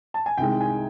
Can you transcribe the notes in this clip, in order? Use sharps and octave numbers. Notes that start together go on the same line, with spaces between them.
A5
G#5
C2 C3 D#3 G#3 G5
G#5